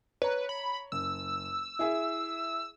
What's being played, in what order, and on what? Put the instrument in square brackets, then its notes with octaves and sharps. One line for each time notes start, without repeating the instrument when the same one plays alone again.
[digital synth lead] B4 [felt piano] C#5 A#5
[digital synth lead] B5
[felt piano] F#1 [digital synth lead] E6
[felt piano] E4 G#4 E5